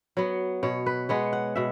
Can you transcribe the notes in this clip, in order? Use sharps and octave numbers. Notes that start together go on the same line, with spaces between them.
F#3 B3
B2 C#5
B4
G#3 B3 C#5
F#5
B2 E5